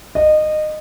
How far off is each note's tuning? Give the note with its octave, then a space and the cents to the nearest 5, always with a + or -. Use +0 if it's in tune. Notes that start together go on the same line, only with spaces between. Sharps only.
D#5 -20